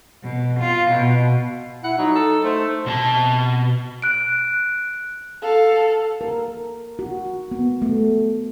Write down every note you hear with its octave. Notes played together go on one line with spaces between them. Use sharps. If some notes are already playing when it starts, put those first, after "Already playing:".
B2
F4
B2
E4 F#5
F#3 D#4
A4
A3 C5
B2 B4 A5
F#6 D7
A4 F5
A#4
F#4
B3
A3